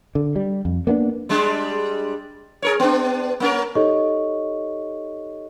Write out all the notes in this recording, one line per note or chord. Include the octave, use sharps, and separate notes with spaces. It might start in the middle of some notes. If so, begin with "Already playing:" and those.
D3
G3
F2
A#3 B3 C#4 D4
G3 G#3 D4
G#4 A#4 C#5
B3 D4
A#3 C#4 A#4
D#4 G4 A4 C#5 D#5 C#6